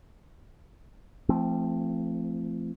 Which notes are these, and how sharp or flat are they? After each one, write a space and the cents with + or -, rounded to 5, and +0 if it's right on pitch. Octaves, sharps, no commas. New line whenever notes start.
F3 -40 A3 +0 C4 +0